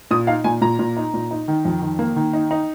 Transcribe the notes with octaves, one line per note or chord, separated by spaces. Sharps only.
A#2 D#6
D#4 F5
A#2 G#5
A#2 A#5
A#2
D#4
A#2
D#4
D#3
F2
D#3
A#3
D#3
D#4
D#4